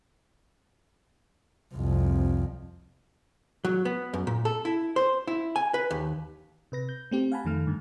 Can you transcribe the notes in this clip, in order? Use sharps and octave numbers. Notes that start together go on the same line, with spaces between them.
C2 F2
F#3
B3
F#2
A#2
A4
E4
C5
E4
G#5
B4
D#2
C3 B4 A#6
G6
A3 C4 G4
F5 F#5 G#5 A5 B5
F2 D#3 A3 F6
G2 D3